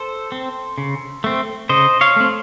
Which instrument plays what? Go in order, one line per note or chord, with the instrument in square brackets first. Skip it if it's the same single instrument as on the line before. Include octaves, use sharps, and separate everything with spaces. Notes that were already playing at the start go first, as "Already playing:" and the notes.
Already playing: [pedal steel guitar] A4 C5
C4
C#3
A3 C4
C#3 C5 D#5
C#5 F5
A3 C4